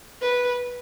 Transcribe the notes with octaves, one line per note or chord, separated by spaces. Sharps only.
B4